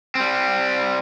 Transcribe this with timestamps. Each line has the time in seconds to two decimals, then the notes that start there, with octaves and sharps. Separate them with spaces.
0.15 G3 C4